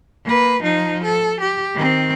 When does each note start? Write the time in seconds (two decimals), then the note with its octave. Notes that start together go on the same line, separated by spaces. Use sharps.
0.24 A#3 B4
0.62 F3 D#4
1.04 A4
1.41 G4
1.75 D#3 C4